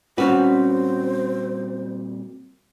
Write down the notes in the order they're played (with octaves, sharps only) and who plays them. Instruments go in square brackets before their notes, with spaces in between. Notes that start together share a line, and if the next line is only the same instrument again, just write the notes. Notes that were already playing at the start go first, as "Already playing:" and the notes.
[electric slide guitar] A#2 G3 C4 [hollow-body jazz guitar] C#4 B4 [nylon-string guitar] F#4 [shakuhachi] C5